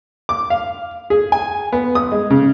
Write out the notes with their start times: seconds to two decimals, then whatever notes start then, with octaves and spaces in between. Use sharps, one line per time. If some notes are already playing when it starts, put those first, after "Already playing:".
0.29 D6
0.50 F5
1.10 G#4
1.32 G#5
1.73 B3
1.95 D#6
2.12 G#3
2.30 C#3